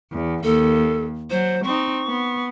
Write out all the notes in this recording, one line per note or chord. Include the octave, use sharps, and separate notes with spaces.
E2
D#2 A4
F#3 C5
C4 D#4 C#6
B3